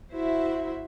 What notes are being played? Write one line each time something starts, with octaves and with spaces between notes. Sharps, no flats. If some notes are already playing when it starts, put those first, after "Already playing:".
E4 F#4 C5 E5